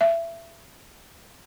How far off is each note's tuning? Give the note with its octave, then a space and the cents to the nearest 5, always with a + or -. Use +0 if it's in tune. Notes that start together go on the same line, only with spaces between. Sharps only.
E5 +25